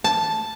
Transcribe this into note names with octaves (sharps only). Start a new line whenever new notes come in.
A5